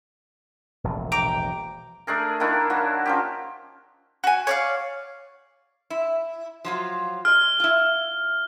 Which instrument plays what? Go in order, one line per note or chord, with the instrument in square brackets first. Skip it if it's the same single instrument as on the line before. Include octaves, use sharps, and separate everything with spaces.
[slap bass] E1 A#1 A2
[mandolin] G5 A#5 D6
[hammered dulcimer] A3 D4 G#4 A#4
D#3 A#3 D4 E4
F#3 A#3 F#4
F3 C#4 G4
[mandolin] F#4 G#5
C#5 D5 F5
[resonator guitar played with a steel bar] E4
F3 F#3 F4
[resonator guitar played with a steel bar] G#4 D#5 [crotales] F6
[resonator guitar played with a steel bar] E4 F4